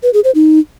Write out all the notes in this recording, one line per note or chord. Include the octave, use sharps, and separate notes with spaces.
B4
G#4
C5
D#4